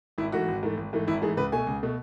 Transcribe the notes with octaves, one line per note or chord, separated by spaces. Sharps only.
G#1 E4
G#2 E3 A3 F#4
G#1
G#2 E3 A3
G#1
G#2 E3 A3
G#1 E4
G#2 E3 A3 G#4
C#2 B4
B2 A3 G#5
C#2
B2 A3